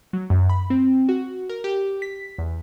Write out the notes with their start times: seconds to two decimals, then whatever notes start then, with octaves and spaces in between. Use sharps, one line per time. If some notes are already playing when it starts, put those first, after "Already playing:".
0.13 F#3
0.30 F#2
0.49 B5
0.70 C4
1.09 F#4
1.49 A#4
1.64 G4
2.02 B6
2.38 E2